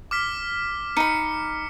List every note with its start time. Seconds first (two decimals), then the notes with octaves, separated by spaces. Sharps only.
0.11 D6 F6 B6
0.97 D#4 B5 C#7